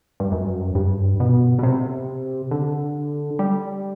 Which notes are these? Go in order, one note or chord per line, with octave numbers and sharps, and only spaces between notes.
G2
F#2
G2
B2
B2
C3
D3
G3